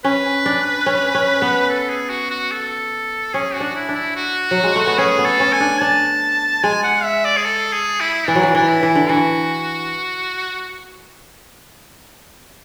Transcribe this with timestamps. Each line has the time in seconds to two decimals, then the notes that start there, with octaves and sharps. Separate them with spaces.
0.04 C#4 B4
0.46 D4
0.86 C#4
1.15 C#4
1.42 B3
1.69 A4
1.89 G#4
2.10 F#4
2.31 F#4
2.52 A4
3.34 C#4 G#4
3.54 F#4
3.60 D4
3.75 E4
3.89 D4
3.95 E4
4.16 F#4
4.51 F#3
4.64 G#3
4.76 A3
4.87 B3
4.98 C#4 G#4
5.19 B3
5.25 A4
5.40 C#4
5.53 G#5
5.60 D4
5.81 D4 A5
6.63 G#3 G#5
6.83 F#5
7.04 E5
7.25 D5
7.36 G#4
7.45 A4
7.73 G#4
8.00 E4
8.28 E3 D4
8.35 F#3
8.43 E3
8.55 E3 D4
8.69 E4
8.83 E3
8.95 D3
9.09 E3 F#4